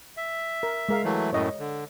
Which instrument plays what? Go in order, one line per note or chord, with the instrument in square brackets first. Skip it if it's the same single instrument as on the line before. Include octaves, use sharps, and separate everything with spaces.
[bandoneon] E5
[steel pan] A#4
G#3 A#4 F5
[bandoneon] E3 F#3 A3
[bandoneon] F#2 A2 [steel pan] C#5 D#5
[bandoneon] D3